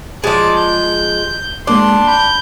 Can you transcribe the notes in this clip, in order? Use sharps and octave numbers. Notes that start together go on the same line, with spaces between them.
F3 G#3 D5 A5
G6
G#3 A#3 D4 C6 D6
B5 G6